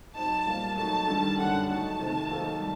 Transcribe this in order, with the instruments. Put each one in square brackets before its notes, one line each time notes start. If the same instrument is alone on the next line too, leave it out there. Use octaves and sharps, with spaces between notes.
[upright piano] F#3 C4 D#4 [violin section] A5
[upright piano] A#2 G3 A#3
[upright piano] F#3 A3 D#4 [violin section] A5
[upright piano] G2 D#3 G3 D4 A4
[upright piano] F#2 D3 G3 D4 [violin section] F#5
[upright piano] F#3 A3 D#4 [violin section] A5
[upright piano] C3 D#3 A3 C4
D#3 F#3 A#3 D#4 A4
G3